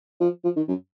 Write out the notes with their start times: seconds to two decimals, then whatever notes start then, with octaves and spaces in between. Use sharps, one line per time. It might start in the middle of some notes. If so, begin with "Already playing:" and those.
0.21 F3
0.44 F3
0.56 D#3
0.68 F#2